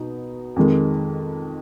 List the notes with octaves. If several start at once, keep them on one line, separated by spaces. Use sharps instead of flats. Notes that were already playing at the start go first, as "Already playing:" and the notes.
Already playing: B2 B3 D#4
F2 D#3 G#3